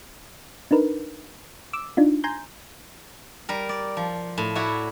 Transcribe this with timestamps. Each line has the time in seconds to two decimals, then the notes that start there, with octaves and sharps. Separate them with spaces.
0.71 D4 D#4 A#4 B4
1.73 D6 E6
1.97 D4 D#4 F4
2.24 G#5 A#5 C6 G6
3.49 G3 A#4
3.69 D5
3.97 F3
4.38 A2
4.55 E4 F#4 C#5 D5